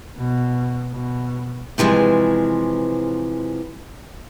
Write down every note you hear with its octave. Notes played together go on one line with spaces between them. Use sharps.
B2
B2
C3 E3 F3 G#3